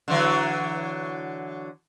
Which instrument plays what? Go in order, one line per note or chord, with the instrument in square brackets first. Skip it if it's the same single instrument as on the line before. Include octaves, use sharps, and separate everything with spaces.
[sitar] D3 E3 F#3